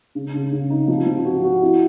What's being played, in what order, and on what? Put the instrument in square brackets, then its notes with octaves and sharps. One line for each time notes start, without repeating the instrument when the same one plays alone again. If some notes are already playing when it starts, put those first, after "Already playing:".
[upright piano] C#3
C#3
C#3
D#4
F3
F3
F#4
F#4
E4